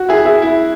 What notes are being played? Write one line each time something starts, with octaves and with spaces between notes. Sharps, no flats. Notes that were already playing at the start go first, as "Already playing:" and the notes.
Already playing: F#4
E4 G#4
E4 G#4
E4